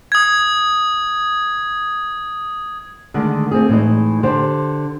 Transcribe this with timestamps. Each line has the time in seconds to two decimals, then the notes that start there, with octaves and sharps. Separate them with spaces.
0.12 D#6 G#6
3.14 D3 D#3 G#3 A3
3.51 A3 C4 G#4
3.69 A2 E3 G#3 D#4
4.23 D3 G4 C5